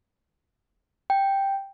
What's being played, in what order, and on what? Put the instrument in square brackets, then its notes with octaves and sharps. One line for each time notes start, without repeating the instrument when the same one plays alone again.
[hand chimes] G5